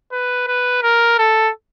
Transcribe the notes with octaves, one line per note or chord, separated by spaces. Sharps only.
B4
B4
A#4
A4